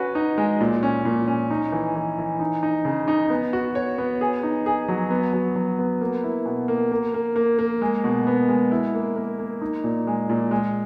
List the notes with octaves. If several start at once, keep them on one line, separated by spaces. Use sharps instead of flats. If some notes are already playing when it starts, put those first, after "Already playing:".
Already playing: C#4 F#4 B4
D#4
G#3
A#2
C#4
A#2
C#4
D#4
E3
E3
E3
D#4
D#4
C#3
D#4
B3
F#4
C#5
B3
G#4
D#4
G#4
F#3
B3
F#3
F#3
B3
A#3
E4
B2
A#3
A#3
A#3
A#3
A#3
G#3
B2
B3
G#3
E4
A#3
A#3
A#3
D#4
A#2
G#3
A#2
G#3